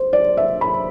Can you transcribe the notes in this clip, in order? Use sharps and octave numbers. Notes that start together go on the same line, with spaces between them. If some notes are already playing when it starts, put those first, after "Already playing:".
Already playing: C5
D5
E5
B5